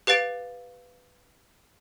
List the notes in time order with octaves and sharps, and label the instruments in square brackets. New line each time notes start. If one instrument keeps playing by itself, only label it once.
[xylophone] G4 B4 F5 A6 D7